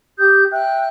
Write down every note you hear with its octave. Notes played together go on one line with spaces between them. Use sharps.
G4 D#6 G6
E5 G5 F#6